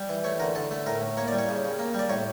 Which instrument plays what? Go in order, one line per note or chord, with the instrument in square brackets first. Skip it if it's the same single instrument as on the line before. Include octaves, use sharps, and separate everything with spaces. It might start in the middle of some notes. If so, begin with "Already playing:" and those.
Already playing: [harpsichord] G3
E3
A3 C#5
D3 A#4
D3 A4
A3
A2 A#4
A2
A#3 C#5
D5
G3
C#5
C#3
C#3
A#3
G3
D5
A2 C#5